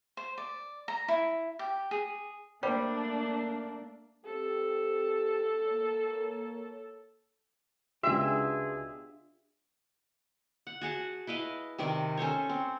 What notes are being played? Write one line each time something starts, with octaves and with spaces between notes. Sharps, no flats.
C5
D5
A#5
E4
G4
G#4
G3 A3 A#3 D4 C5
C4 G4 A4
A#3 C#5
C#2 B2 D4 F4 G4 G#4 E5 C6
F#5
F#4 G#4 F#5 A5
E4 B4 D#5 F5
C3 D#3 A#4 D5
C#4 A4 C5 C#5
C4